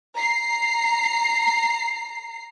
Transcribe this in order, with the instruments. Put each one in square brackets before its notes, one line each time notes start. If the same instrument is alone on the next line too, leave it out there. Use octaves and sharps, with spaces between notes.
[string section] A#5 C7